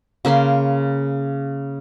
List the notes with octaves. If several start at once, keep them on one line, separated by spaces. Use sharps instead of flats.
C#3 A#3 B5 C6